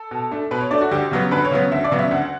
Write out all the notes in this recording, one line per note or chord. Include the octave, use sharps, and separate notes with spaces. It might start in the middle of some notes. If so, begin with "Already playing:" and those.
Already playing: A4
B2
A3 D4
B2 B4
C#5
A3 D4 D5
F#4
D2 G4
C#3 F#3 B3
D2 B4
C#5
C#3 F#3 B3
D2 E5
D5
C#3 F#3 B3
E5
D2 F#5